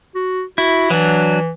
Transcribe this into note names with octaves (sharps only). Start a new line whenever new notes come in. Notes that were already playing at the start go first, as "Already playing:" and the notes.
F#4
E4 F#4
E3 F#3 D4